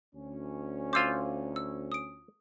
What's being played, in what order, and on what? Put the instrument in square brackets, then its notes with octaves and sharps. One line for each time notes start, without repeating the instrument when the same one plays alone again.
[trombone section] D2 C#4
[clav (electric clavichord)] F4 C5 [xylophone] D6 E6 G#6
[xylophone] E6
D#6 D7